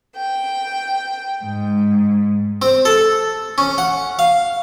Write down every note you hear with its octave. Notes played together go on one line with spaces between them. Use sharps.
G5
G#2
C4
A4
C#4
F#5
F5